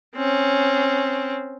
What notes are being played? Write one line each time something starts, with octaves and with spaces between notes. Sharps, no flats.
C4 C#4